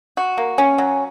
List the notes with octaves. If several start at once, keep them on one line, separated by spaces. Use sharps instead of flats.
F#4
A#3
C#4
F#3